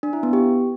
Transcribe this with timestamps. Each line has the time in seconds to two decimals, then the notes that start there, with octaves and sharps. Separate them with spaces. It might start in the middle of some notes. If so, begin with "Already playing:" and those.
0.03 D4
0.13 E4
0.23 B3
0.33 G4